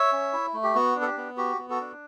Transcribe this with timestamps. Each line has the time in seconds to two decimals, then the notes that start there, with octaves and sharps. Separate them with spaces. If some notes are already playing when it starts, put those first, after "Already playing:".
Already playing: C#5 E5
0.12 C#4
0.33 E4
0.54 A3
0.63 G4
0.75 B3 F#4
0.96 D4
1.02 A4
1.06 G4
1.17 B3
1.37 F#4 G4
1.59 B3
1.70 F#4 A4
1.81 D4